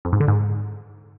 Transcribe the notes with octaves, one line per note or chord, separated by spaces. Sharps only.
F2
G#2
D3
G#2